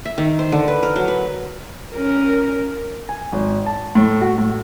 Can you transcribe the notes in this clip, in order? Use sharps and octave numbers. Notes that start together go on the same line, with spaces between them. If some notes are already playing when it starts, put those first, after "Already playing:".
E5
D#3
C5
D3
B4
A#4
F#3
B4
C#4 A#4
G#5
G#1
A5
A2
F#4
A2